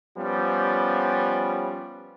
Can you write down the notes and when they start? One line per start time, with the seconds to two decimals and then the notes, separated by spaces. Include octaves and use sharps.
0.18 F3 G3 B3 C#4